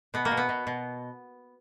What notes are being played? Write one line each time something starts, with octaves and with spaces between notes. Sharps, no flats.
B2 B3
A#3
B2
B3
B2
B2